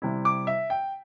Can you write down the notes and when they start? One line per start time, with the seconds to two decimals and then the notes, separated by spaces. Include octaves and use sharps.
0.02 C3 G3 E4
0.25 D6
0.47 E5
0.70 G5